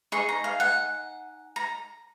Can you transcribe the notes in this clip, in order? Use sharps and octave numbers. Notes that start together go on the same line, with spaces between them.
D#4 G#4 D#5 C#6
A#5
F5
F#5
A#5